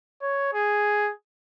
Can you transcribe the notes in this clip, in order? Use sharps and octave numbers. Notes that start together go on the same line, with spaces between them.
C#5
G#4